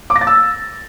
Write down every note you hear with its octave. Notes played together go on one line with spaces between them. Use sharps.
D6
A#6
A6
E6